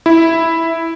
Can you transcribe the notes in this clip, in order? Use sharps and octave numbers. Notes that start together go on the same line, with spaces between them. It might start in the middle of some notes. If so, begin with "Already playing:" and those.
E4